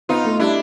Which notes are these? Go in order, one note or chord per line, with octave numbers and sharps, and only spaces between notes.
B3 D#4 F4
A3
G3 D4 E4